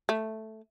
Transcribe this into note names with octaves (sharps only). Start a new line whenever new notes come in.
A3